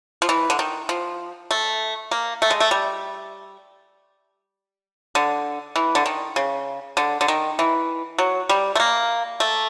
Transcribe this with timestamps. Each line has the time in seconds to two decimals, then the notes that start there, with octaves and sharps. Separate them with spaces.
0.22 F3
0.29 E3
0.50 D3
0.59 D#3
0.89 F3
1.51 A3
2.11 A#3
2.42 A3
2.50 G#3
2.60 A3
2.71 G3
5.15 D3
5.76 E3
5.95 D3
6.06 D#3
6.36 C#3
6.97 D3
7.21 D3
7.28 D#3
7.59 E3
8.18 F#3
8.49 G3
8.75 A3
8.80 A#3
9.40 A3